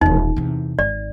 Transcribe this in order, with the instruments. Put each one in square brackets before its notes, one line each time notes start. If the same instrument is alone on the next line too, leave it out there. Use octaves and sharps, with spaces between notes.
[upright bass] D#1 A1 [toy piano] D#4
[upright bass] E2 C3
[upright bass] G#1 [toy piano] D5